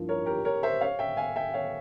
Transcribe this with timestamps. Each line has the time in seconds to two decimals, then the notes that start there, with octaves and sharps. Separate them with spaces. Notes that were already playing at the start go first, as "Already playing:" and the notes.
Already playing: G2 F3 A#3 E4
0.09 A#4 C#5
0.26 G4 A#4
0.45 A#4 C#5
0.63 C5 E5
0.81 C#5 F5
0.99 E5 G5
1.17 F5 G#5
1.36 E5 G5
1.54 C#5 F5